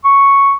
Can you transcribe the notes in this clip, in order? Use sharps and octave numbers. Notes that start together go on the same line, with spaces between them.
C#6